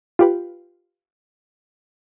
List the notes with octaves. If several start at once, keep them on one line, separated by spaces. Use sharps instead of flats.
F4 G4 B4